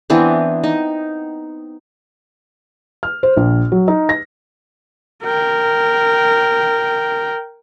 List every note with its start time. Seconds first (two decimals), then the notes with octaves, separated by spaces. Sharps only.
0.10 E3 B3 C4 D4
0.64 D#4
3.03 F6
3.23 C5
3.37 A#1
3.72 F#3
3.88 D#4
4.09 A#6
5.24 A#4 G5